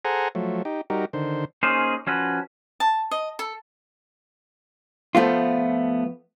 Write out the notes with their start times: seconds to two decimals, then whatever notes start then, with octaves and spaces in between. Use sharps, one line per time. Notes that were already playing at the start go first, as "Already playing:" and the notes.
0.05 G#4 A4 C5 F#5 G#5 A#5
0.35 F3 F#3 A3
0.65 D#4 G4
0.90 G3 D#4 F#4 G4 A#4
1.13 D3 D#3 C5
1.63 A#3 C#4 D#4 G#4 C5
2.07 F3 C#4 F#4 B4
2.80 A5
3.11 D#5
3.39 A4
5.15 F3 A3 B3 F4